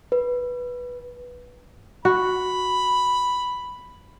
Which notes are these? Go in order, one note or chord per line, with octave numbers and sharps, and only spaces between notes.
B4
F#4 B5